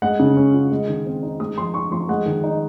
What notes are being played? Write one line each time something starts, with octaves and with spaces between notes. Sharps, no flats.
G#3 F#5
C#3
C#4
F4
G#3
D#3
C4
D#4
G#3 D#6
F3 C6
D#4 C#6
F3 C6
G#3 F#5
D#3
D#4